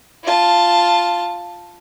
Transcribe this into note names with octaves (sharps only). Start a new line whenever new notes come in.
F4 A5